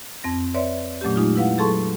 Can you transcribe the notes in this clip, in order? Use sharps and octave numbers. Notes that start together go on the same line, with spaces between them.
F2 C4 A#6
B4 C#5 D5 E5 C6
A#2 F#3 A3 C#4 G4
G#3 D#4 F4
E4 B4 F5 F#5
F#3 G#4 A4 A5 C6 C#6